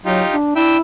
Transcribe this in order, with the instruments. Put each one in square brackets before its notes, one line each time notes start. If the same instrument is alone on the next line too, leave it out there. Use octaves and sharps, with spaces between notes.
[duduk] F#3 [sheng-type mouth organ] D#4 F4 G4
[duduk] D4
[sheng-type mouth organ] D4 E5 G5 [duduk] E4